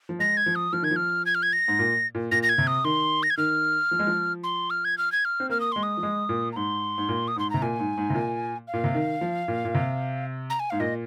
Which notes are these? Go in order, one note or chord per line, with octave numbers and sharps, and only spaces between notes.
F3
G#3 A#6
G#6
F3
D#6
F3 F6
D#3 G#6
F3
F6
G#6
F6
G#6
A#6
G#2
A#2
A#2
A#2 A#6
A#6
G#6
C3
D#6
D#3 C6
A#6
G#6
D#3 F6
F3
G#3
F3
C6
F6
G#6
F6
G#6
F6
C4
A#3 F6
D#6
G#3 C6
D#6
F3
G#3
A#2
A#5
G#2 C6
G#2
A#2
D#6
G#2 C6
C3 A#5
A#2 G#5
G#2
G#2
C3
A#2
F5
A#2
C3
D#3
F3
A#2
A#2
C3
A#5
G#5
G#2 F5
A#2 D#5